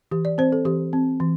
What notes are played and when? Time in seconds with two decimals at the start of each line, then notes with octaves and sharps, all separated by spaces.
0.11 E3 G4
0.25 D5
0.38 C4 C5
0.52 A4
0.65 E3 G4
0.93 C4
1.20 E3